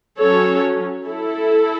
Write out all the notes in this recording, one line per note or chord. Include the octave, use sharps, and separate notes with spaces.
F#3 C#4 A4 C#5
E4 A4